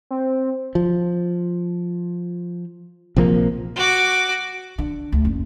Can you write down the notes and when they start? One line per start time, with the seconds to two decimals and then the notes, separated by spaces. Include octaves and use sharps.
0.11 C4
0.75 F3
3.17 A#1 C3 F3 A#3
3.76 F#4 D6
4.78 D3
5.12 D2
5.25 F#1